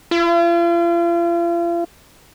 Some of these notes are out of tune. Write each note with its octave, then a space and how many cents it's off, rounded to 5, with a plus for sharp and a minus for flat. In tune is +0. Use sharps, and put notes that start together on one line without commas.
F4 -40